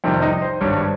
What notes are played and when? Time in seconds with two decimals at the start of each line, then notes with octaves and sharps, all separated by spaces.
0.04 F2 C3 D#3 G3
0.22 D#4 D#5
0.42 C5
0.61 G#1 G2 G3 C#5